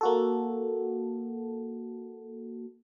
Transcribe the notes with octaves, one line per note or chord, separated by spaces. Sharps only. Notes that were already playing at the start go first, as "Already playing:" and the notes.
A#3 F#4 A4